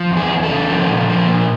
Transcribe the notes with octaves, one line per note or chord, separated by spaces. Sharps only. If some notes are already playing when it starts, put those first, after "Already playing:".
Already playing: F3
E2
G#4
E2
A4
C#3
F3
A#2
F3
A#2